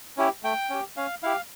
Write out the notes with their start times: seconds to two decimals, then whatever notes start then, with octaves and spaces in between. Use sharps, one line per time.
0.17 C#4 E4 G4
0.43 A3 G5
0.70 C#4 G4
0.97 C#4 F5
1.23 E4 G4 F5